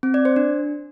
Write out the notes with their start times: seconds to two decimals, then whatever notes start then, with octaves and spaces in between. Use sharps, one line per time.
0.03 C4
0.14 D5
0.25 C5
0.36 D4